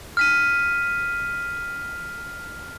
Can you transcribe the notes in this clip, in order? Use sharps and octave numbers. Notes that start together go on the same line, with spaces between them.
F6 B6 D#7